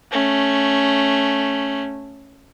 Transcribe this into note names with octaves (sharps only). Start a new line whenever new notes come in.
A3 C#4